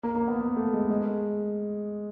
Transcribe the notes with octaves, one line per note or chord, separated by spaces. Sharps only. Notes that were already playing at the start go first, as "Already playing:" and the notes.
A#3
A#3
B3
A#3
A3
G#3
G#3